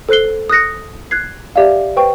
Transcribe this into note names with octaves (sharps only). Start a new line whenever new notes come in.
A4 C5 F#6 C7 G7
D#6 F#6 A#6 C#7
F#6 G#6 C7
G4 D5 E5 F5
B4 C5 G5 C#6